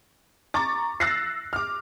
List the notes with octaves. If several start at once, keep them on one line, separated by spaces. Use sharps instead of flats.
A#5 C#6 D6 A6
E6 F#6 A6 A#6 C7
D6 F6